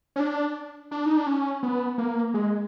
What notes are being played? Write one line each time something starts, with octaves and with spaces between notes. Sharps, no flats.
C#4
D4
D4
D#4
D4
C#4
B3
A#3
G#3